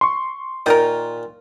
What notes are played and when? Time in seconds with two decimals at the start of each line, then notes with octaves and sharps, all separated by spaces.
0.01 C6 C#6
0.66 A#2 D#3 F4 A#4